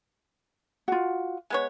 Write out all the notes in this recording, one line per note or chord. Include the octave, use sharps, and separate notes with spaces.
F4 F#4
G#3 B3 C#5